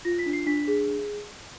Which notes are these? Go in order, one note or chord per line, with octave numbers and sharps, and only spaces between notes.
F4 A#6
B6
D4
C7
D4 B6
G#4